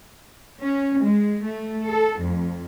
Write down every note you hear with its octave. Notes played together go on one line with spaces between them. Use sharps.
C#4
G#3
A3
A4
F2